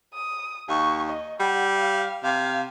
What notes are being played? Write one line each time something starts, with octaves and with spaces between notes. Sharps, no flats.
D#6
D#2 C#6
D#5
G3 F#5
F5
C3 F5